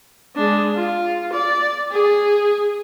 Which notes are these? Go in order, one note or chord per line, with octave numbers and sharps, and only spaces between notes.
G#3 D4
F4
D5
G#4